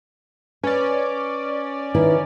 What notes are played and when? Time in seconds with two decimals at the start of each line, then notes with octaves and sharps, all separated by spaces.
0.63 C#4 B4 D5
1.95 D#3 E4 B4